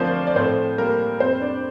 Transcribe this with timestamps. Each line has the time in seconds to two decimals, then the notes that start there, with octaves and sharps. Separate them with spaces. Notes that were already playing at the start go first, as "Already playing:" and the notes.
Already playing: D2 F3 C4 D4 A#4 C5 D5
0.27 D5
0.36 A2 C4 C5
0.78 G3 A#3 A#4
1.20 F2 C4 C5
1.41 D4 D5